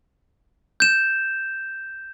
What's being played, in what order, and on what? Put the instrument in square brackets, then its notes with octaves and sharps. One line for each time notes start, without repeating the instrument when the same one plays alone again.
[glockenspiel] G6 E7